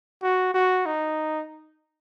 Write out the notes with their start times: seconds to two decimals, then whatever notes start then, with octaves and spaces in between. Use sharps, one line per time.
0.23 F#4
0.54 F#4
0.86 D#4